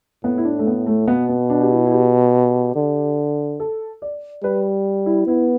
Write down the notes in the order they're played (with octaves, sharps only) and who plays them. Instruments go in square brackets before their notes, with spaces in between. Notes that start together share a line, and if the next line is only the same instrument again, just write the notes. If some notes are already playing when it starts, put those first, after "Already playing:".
[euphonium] A2 [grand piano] B3
[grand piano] E4
D4
A3
B3
A3
[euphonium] B2 [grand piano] B3
[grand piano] B3
D4
G4
E4
E4
G4
[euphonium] D3
[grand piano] A4
D5
[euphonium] G3 [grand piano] B4
[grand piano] E4
[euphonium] B3 [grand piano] E4